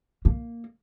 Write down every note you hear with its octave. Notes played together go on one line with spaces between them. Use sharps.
A#3